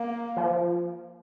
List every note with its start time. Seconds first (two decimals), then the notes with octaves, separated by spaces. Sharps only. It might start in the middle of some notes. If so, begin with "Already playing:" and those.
Already playing: A#3
0.37 F3